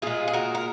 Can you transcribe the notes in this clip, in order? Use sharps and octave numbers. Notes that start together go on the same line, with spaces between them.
A#2 G#3 F4 G#4
G#4
F#4 A#4
A#4